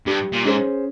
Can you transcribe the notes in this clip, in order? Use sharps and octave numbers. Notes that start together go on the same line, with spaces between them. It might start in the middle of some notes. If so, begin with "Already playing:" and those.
G2 G3
A#2
G#2 C#4 G#4 C5